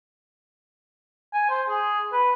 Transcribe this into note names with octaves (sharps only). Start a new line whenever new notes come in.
G#5
C5
G#4
B4